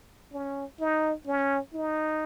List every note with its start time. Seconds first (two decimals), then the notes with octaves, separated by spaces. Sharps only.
0.32 C#4
0.80 D#4
1.26 C#4
1.74 D#4